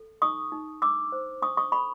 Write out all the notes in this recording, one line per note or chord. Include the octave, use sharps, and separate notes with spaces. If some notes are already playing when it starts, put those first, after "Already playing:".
Already playing: A4
D#4 C#6 D#6
D#4
D4 D6 E6
C5
D4 C#6 D#6
C#6 D#6
A4 B5 C#6